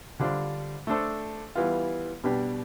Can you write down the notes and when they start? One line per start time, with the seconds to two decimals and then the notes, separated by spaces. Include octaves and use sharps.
0.20 D3 G3 D4 F4 C5
0.87 A3 D4 A4 C5
1.55 E3 G3 B3 F4
2.24 B2 G3 D4 G4 B4